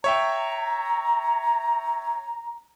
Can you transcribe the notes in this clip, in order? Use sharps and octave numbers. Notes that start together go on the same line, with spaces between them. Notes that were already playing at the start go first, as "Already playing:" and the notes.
C#5 E5 G5 A#5